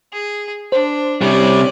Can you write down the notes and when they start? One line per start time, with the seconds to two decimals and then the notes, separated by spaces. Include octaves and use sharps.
0.13 G#4
0.72 D4 C5
1.21 C3 G3 C#4 D5